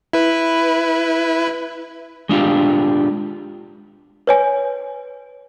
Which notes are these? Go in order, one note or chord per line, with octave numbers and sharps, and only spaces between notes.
E4 B4
G#3 D4 F4 G4
B4 C#5 G#5